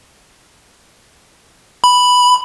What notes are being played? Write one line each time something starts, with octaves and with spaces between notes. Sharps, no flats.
B5